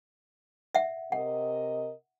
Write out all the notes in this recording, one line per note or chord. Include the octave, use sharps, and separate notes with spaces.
E5 F#5
C3 A#4 D#5 F#5